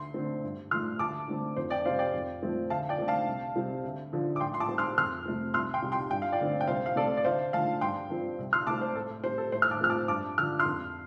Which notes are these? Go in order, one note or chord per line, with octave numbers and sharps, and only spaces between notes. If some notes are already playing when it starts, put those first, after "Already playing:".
Already playing: D2 C6
D3 A3 C4
G2
F3 A3 C6 F6
D2 A5 D6
D3 A3 C4
F2 C5
D5 G5
C3 G3 C4 C5 F5
D5 G5
F2
F3 A3 C4
D2 F5 A5
D5 G5
D3 A3 C4
F5 A5
C2
C3 G3 C4
D2
D3 F3
D6
A2 G5 C6
C6
A5 D6
G3 C4
C6 F6
F2 C6 F6
C3 A3 C4
C2 C6 F6
G5 C6
C3 G3
G5 C6
G2 G5
F5
D5 G5
D3 A3 C4
G5
C2 C5 F5
F5
C3 A3 C4 A4 D5
D5
D2 C5 F5
D3 F3 A3 F5 A5
G2 G5 C6
F3 C4
C2
C6 F6
C3 A3 C4 A5 D6
C5
A2 A4
G3 C4 C5
A4
A2 C5
F6
A5 D6
F3 A3 C4 F6
A5 D6
G2 A5 D6
D3 F3 F6
C6 F6
F2